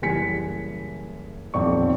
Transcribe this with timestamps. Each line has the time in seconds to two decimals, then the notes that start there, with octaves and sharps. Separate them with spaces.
0.02 F#1 E3 G3 G#5 B6 C#7
1.54 D#1 B1 F2 C4 D5 C#6